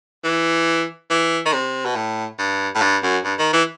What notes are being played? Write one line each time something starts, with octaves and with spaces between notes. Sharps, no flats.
E3
E3
D#3
C3
B2
A2
G2
A2
G2
F#2
G2
D#3
E3